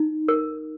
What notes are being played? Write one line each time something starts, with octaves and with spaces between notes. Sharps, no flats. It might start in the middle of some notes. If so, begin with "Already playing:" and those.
Already playing: D#4
A#4